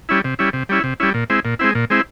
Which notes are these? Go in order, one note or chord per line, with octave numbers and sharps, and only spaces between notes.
G3 C#4 E4
C3
G3 C#4 E4
C3
G3 C#4 E4
C3
G3 C#4 E4
A#2
G#3 C4 E4
A#2
G#3 C4 E4
A#2
G#3 C4 E4